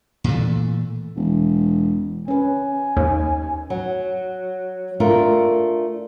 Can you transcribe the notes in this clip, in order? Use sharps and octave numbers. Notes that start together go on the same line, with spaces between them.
A#2 E3 A3
E1
C#4 B4 G#5
D#2 D#4
F#3
A3 D4 F4 A#4